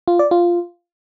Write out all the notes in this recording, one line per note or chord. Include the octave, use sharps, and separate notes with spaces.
F4
D5
F4